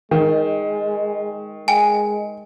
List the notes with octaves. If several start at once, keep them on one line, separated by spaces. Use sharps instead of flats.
D#3 G#3
G#3 G5 G#5